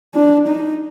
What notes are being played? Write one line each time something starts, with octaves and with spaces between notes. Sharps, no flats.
D4
D#4